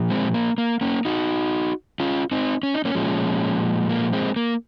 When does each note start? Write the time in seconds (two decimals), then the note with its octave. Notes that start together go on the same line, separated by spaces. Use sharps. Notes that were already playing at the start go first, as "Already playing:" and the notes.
Already playing: A#2 F3
0.10 G#3 C4
0.34 A#3
0.58 A#3
0.81 A#3 C#4
1.05 D#4 F#4
2.00 C#4 F4
2.31 C4 D#4
2.63 C#4
2.74 D#4
2.85 A#3 C#4
2.95 A#2 F3 G#3
3.89 A#3
4.13 G#3 C4
4.36 A#3